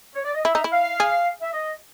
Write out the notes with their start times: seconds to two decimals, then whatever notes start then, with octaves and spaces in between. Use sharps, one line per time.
0.16 C#5
0.25 D5
0.35 D#5
0.45 E4 E5
0.55 D#4
0.64 E4
0.72 F5
1.00 G#4
1.42 E5
1.54 D#5